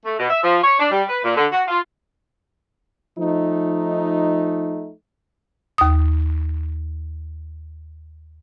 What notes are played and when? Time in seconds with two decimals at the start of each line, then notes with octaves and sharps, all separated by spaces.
0.05 A3
0.18 B2
0.30 E5
0.43 F3
0.63 C#5
0.80 D4
0.91 G3
1.09 B4
1.23 A#2
1.36 D3
1.52 F#4
1.68 F4
3.18 F3 A3 D#4
5.78 D#2 D#6